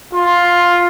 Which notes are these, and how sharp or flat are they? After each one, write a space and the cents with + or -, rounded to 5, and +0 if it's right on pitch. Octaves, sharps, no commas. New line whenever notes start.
F4 +10